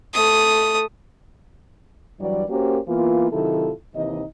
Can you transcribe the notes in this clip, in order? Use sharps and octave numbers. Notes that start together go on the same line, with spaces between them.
A3 D#6
G2 E3 F#3 G3 D5
A#3 C#4 F#4 G4 A#4 C5
E3 A#3 B3 F4
C3 D#3 F#3 E4 F4 A4
D#2 C3 E3 D#4 D#5